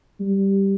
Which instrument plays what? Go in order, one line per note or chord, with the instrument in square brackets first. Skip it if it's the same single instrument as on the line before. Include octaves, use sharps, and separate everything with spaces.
[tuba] G3